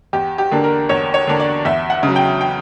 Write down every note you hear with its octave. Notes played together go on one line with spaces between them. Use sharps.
E2 G4
G4
D3 A#3 D4
A#4
E2 C#5
C#5
D3 A#3 D4
D5
E2 E5
F#5
C#3 F#3
G5
G5